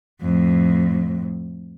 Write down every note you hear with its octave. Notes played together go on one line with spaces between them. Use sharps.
F2 A2